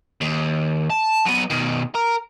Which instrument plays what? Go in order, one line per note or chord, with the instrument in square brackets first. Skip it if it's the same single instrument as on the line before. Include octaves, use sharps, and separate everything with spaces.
[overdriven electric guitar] D#2
A5
F#3 B3
B2 D#3
A#4